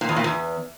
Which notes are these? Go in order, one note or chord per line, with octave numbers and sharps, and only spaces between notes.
A#2
E2
A#2
E2